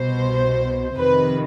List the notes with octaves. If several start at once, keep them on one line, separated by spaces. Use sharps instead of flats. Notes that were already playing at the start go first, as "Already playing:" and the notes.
Already playing: C2 B2 C5
F2 C3 D#3 B4